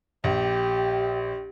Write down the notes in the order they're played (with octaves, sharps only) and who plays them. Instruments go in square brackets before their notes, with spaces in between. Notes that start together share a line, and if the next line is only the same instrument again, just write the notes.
[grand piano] A#1 [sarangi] G4